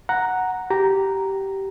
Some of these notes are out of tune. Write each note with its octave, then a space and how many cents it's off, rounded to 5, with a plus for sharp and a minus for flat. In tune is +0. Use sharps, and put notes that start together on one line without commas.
F#5 +0 A#5 +0
G4 -15 A#5 +0